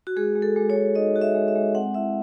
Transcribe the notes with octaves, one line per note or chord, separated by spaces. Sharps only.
F#4
G#3 G#4
G#3
A4
G#3
C#5
G#3
D#4 D#5
F#4
E5
G#3
E5
G#3
C4 F#5
E4 E5